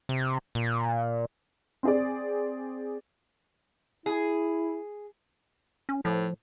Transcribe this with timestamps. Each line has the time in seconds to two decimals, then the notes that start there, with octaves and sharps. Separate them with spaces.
0.09 C3
0.55 A#2
1.83 C4 G#4 D5
4.06 E4 G#4
5.89 C#4
6.05 A2 F3